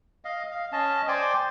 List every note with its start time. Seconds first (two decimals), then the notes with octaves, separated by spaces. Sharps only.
0.25 D#5 F5
0.51 F5
0.72 C#4 D#5 A5
1.08 C5 D5 G5 G#5